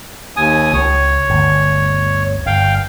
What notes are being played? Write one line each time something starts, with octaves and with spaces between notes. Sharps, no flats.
D#2 G#5 D#6
C#2 C#5
G1 D2
G1 F5 G5